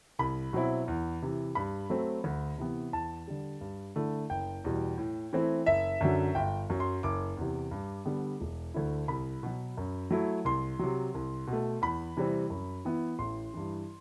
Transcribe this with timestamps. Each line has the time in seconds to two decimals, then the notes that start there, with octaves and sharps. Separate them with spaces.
0.19 C2 B5
0.53 B2 F#3 C4 E4
0.88 E2
1.22 C3 E3
1.55 G2 B5
1.90 F#3 A3 C4
2.24 D2
2.58 C3 E3 B3
2.93 E2 A5
3.28 D3 G3
3.61 G2
3.96 D3 A3 E4
4.30 F#1 G5
4.64 E2 B2 G3
4.98 A2
5.33 E3 A3 C4 E4
5.66 F#1 E5
6.01 F#2 D3 F#3
6.35 G1 G5
6.70 F#2 F#3
6.80 C6
7.03 F#1 D6
7.37 E2 C3
7.71 G2
8.05 D3 G3 B3
8.41 E1
8.74 D2 D3 A3 E4
9.08 C2 B5
9.43 B2 F#3
9.77 F#2
10.11 F#3 A3 E4
10.45 C2 C6
10.79 C3 F#3
11.14 C2
11.47 B2
11.53 A3
11.82 E2 B5
12.17 C3 E3 G3 C4
12.50 F#2
12.85 E3 B3 E4
13.19 A1 C6
13.54 G2 E3